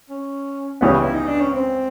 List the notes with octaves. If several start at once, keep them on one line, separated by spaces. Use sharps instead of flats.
C#4
C#2 C#3 E3 G3 B3 C#4
E4
D#4
D4
C#4
C4